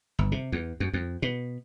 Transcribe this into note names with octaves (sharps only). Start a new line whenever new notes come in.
G1
C3
E2
F#2
F2
B2